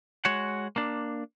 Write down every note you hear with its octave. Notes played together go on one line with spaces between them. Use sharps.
G#3 F#4 C#5 F#5
A#3 D4